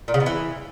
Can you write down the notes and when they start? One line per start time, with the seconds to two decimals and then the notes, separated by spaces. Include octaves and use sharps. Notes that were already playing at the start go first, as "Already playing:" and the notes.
0.08 A#2
0.14 C#3
0.20 B2
0.26 E3